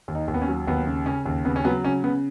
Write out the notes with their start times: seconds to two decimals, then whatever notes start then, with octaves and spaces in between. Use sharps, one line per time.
0.08 D#2
0.15 D#4
0.28 D#2
0.34 B3
0.42 C#4
0.48 F#3
0.67 D#2 B3
0.87 C#3
1.06 C#3 C#4
1.25 D#2
1.45 C#3 B3
1.56 C#4
1.65 F#3 B3
1.85 C#3 C#4
2.04 C#3 B3